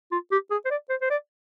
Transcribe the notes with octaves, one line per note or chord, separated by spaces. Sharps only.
F4
G4
G#4
C5
D5
C5
C5
D5